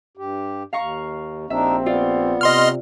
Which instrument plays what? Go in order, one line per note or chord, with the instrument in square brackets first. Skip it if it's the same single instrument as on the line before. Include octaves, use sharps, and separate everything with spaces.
[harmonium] G2 G4
[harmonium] D#2 [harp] F5 A#5 C#6
[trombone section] A#1 C4 G4 [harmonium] D4 D#4 [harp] E5
[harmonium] B3 [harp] F4 D5
[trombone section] C3 [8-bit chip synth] D#5 C6 F6